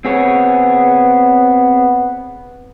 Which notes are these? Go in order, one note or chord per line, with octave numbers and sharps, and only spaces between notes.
B3 C4 G#4 C#5